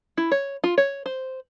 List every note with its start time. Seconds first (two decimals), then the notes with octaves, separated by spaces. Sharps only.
0.17 E4
0.31 C#5
0.64 F4
0.78 C#5
1.06 C5